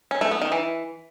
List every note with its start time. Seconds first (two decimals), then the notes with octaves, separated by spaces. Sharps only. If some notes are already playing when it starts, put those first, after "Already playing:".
0.11 C#4
0.21 A3
0.31 B3
0.42 D#3
0.52 E3